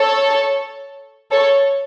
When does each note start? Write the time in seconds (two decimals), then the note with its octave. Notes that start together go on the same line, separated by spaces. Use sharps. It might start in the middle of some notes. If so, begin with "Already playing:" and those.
Already playing: A4 C#5
1.31 A4 C#5